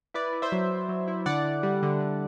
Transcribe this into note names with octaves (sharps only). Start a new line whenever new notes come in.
E4 B4 D5
E4
C5 E5
F#3
F#3
F#3
E4
D3 D5 F#5
D3
G3
D3
D3